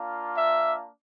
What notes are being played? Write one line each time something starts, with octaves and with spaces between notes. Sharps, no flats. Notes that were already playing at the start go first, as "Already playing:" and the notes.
Already playing: A#3 D4 F4
E5